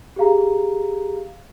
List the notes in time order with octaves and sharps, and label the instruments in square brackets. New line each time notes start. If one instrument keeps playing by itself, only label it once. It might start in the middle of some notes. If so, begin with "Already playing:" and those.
[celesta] G4 G#4 F5 A#5